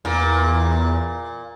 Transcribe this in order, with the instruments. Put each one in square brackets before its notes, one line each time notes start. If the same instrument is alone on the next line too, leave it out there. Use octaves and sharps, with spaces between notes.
[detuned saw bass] E2 [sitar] A#2